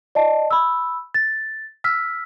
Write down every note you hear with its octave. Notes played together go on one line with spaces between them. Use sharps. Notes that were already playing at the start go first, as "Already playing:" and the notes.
D5 D#5 A5
B5 E6
A6
E6 F6 B6